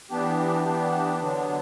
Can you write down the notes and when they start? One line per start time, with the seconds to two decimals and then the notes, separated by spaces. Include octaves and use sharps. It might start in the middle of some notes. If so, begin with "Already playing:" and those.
0.10 E3 B3 D4 G4
0.65 E3 B3 D4 G4
1.21 D3 F#3 B3 D4